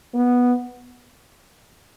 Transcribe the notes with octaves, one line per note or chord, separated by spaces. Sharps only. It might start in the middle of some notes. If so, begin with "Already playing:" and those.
B3